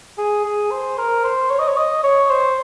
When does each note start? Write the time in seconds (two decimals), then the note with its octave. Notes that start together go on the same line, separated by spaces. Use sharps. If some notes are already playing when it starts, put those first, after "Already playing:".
0.18 G#4
0.44 G#4
0.71 C5
0.98 A#4
1.24 C5
1.50 C#5
1.59 D#5
1.67 C#5
1.77 D#5
2.03 C#5
2.30 C5